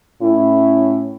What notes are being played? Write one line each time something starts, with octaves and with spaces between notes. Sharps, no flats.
A2 C#4 E4